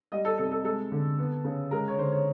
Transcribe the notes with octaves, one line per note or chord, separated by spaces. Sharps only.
G3 D#5
A4
C3 A4
A4
G#3 A4
D3
B3
C#3
G#3 A#4
C#5
D3 C5
C#5